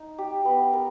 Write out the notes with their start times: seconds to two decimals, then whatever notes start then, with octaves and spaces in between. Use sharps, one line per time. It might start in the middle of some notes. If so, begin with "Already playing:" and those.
Already playing: D#4
0.18 G4
0.45 B3
0.73 A#4